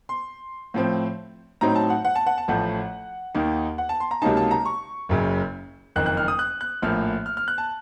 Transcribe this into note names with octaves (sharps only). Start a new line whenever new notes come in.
C6
A2 F3 C4
A2 F#3 C4 D#4 A#5
A5
F#5
F#5
A5
F#5
A5
A1 A2 F3 A3 F#5
D#2 D#3 A#3 D#4
F#5
A5
C6
A#5
C#2 C3 F#3 A#3 D#4 A5
A5
A#5
C#6
F#1 F#2 C#3
F#1 F2 D#3 F#6
F#6
F6
D#6
F#6
F#6
A#1 A2 F3 A#3 F6
F6
F6
F#6
A5